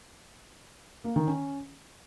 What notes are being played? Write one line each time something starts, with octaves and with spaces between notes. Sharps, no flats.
A#3
D#3
C#4